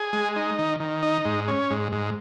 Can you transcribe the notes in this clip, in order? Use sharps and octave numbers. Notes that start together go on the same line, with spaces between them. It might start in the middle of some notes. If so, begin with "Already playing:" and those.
Already playing: G#4
G#3
D#4
D#3
D#3
D#4
G#2
C#4
G#2
G#2